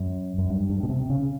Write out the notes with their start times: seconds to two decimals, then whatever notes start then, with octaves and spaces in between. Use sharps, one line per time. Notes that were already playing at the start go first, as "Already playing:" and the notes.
Already playing: F#2
0.38 F#2
0.49 G2
0.69 G2
0.83 B2
0.89 C3
1.10 C#3